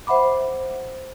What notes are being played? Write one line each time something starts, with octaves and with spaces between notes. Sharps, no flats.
C5 E5 F#5 B5 D6